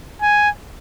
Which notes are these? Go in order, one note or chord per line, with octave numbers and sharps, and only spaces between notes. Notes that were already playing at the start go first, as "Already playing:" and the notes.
G#5